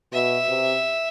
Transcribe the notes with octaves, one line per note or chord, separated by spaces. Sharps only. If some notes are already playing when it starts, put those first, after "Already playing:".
B2 E5
C3